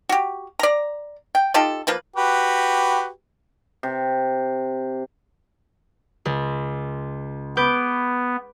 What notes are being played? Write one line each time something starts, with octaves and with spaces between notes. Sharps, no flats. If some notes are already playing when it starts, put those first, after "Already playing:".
F#4 G4
D5 A#5
G5
D#4 F4 G4 A4
F3 A#3 B4
F#4 G4 B4
C3
C#2
B3 B4 D6 G6